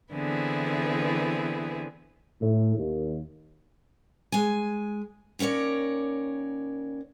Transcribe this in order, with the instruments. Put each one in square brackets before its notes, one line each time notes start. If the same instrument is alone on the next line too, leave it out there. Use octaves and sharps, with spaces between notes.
[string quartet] D3 E3 B3 C4 E4 G#4
[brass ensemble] A2
D#2
[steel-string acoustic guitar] G#3 G#5
D#2 C#4 A#4 C#5 D5